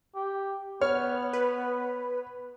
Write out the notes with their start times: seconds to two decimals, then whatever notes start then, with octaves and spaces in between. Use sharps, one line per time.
0.15 G4
0.81 B3 C#5 F6
1.33 B4